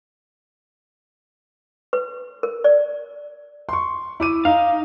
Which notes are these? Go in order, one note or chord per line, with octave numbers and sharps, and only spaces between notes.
B4
A#4
D5
C6 C#6
E4 D6 D#7
D#4 F5